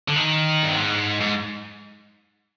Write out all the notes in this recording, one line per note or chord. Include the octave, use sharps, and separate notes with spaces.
D3
D#3
G2
G#2
G#2